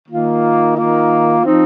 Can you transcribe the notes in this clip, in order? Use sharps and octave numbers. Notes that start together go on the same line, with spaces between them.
D#3 A#3 F4
D#3 A#3 F4
F3 C4 D#4